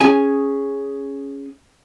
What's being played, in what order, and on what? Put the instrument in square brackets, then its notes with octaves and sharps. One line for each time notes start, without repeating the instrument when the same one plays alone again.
[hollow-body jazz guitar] C#4 G#4 G#5